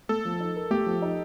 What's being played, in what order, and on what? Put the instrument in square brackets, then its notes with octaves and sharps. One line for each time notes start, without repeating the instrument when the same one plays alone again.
[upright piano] A3 [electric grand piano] A4
[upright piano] F3
D#4
A#4
[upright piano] A3 [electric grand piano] G4
[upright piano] F3
D#4